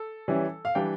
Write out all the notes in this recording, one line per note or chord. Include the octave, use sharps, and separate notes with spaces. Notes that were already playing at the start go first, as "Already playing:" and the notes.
Already playing: A4
E3 G3 C#4 E4
F5
E3 G3 D4 G5